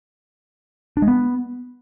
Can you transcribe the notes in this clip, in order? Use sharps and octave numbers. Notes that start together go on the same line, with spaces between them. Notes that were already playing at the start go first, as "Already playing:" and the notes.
D4
G#3
B3